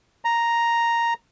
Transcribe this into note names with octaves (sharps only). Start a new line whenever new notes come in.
A#5